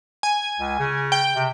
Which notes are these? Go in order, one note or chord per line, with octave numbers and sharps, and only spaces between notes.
G#5
C#2
C#3
G5
C3